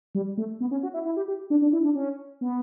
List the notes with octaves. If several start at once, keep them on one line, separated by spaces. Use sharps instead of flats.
G3
A3
B3
C#4
F#4
E4
E4
G4
G4
D4
D4
E4
D4
C#4
B3